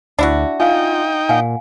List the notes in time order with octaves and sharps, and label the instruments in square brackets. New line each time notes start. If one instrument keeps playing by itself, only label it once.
[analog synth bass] D2 [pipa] D4 E4 F#4
[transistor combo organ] D#4 G5 [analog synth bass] F4 [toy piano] F5 G#5
[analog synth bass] A#2 [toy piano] F5 F#5 G#5